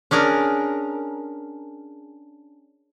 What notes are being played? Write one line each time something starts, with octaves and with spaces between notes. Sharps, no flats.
C#4 D4 G#4 A#4